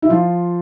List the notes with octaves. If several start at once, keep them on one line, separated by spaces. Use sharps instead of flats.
E4
F3 F4